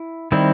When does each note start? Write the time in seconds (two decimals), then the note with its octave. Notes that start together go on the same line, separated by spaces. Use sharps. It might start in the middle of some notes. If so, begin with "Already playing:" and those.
Already playing: E4
0.32 D#3 G3 C4 E4